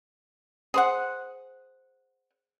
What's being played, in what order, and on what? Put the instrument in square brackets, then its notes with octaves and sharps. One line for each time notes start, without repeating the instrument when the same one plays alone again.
[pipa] G#4 C5 F#5